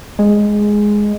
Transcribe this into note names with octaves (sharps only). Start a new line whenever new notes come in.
G#3